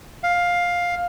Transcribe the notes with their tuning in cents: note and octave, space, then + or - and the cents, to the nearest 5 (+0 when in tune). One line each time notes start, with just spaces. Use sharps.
F5 +10